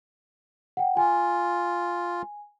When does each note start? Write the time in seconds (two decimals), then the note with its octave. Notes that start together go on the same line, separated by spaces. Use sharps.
0.77 F#5 G5
0.97 F4 G#5